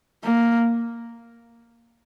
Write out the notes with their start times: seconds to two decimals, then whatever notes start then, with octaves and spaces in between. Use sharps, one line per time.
0.24 A#3